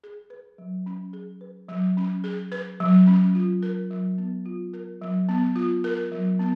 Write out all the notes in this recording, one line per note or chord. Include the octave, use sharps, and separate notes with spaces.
G#4
B4
F#3
C#4
G#4
B4
F#3
C#4
G#4
B4
F#3
C#4
F4
A#4
F#3
B3
F4
A#4
F#3
B3
F4
A#4
F#3
B3